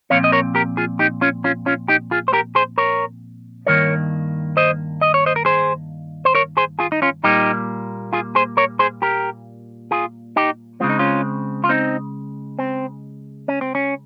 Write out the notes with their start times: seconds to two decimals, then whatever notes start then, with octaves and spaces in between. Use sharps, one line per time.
0.10 A#2 F3 C4 C#5 F5
0.24 D#5
0.32 A#4 C#5
0.55 G4 A#4
0.77 F4 G#4
0.99 D#4 G4
1.21 C#4 F4
1.44 C#4 F4
1.66 C#4 F4
1.88 D#4 G4
2.11 F4 G#4
2.28 C5
2.33 G4 A#4
2.55 G#4 C5
2.78 A#4 C#5
3.66 G2 D#3 A#3 A#4 C#5
4.57 C5 D#5
5.01 D#5
5.14 C#5
5.26 C5 D#5
5.36 A#4
5.45 G#4 C5
6.25 C5
6.35 A#4 C#5
6.57 G#4 C5
6.79 F4 G#4
6.92 D#4
7.02 C#4 F4
7.24 A#2 G3 A#3 D#4 G4
8.13 F4 G#4
8.35 G#4 C5
8.57 A#4 C#5
8.79 G#4 C5
9.02 G4 A#4
9.91 F4 G#4
10.36 D#4 G4
10.80 C#3 G#3 C4 F4
10.89 D#4
10.99 C#4 F4
11.64 F4
11.69 C4 D#4
12.59 C4
13.48 C#4
13.61 C4
13.75 C#4